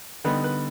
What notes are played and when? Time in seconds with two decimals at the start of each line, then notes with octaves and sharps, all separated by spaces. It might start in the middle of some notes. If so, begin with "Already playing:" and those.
0.24 D3 G3 B3 D#4 B4
0.44 B4